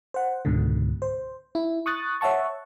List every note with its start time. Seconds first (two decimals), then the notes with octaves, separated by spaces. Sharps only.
0.14 C5 F#5
0.45 C#2 G#2 B2 D3
1.02 C5
1.55 E4
1.86 C#6 D#6 F#6 A6
2.21 C#5 E5 F#5 A5 C#6